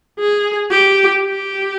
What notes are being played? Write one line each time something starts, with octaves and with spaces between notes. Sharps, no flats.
G#4
G4
G4